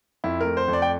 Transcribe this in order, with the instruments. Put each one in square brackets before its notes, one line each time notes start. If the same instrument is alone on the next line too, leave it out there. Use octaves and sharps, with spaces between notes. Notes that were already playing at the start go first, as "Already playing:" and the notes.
[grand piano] F2 E4
A3 A#4
C5
F2
D5
G5